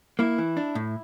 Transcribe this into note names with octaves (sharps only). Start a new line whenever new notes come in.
A#3 E4
E3
D4
A2